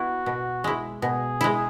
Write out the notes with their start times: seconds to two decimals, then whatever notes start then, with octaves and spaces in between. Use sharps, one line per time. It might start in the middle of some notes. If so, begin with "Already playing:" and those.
Already playing: B3 E4 F#4
0.26 B2
0.64 G#3 E4
1.02 B2 G#4
1.41 G#3 E4